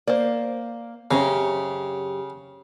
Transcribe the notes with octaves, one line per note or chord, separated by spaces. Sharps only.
A#3 C5 D5
F#2 C#3 C4 C#4 G4 C5 A#5